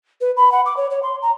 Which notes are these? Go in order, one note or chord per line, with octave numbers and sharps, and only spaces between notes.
B4
B5
F#5
D6
C#5
C#5
C6
A#5